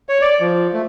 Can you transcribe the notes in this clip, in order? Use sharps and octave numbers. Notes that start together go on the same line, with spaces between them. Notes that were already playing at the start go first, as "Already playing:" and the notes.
C#5
D5
F3
A3